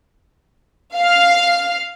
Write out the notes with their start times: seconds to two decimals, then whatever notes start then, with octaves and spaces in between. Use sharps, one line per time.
0.96 F5